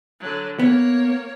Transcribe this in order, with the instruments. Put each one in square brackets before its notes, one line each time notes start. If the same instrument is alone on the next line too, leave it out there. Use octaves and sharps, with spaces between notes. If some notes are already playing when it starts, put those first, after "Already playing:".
[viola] D3 F#3
[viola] A#3 C#5 [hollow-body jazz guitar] B3